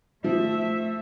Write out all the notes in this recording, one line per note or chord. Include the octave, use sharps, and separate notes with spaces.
F3 A3 E5